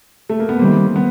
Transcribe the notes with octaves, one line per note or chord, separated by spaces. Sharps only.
A3
A#3
B3
D#3 G3 A#3 C4
B3